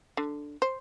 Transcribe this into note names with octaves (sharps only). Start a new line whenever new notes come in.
D3
C5